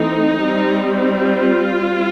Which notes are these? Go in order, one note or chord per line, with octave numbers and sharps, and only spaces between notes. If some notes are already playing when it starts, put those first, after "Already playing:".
Already playing: E3 A3 C4 D#4
G3 C4
F4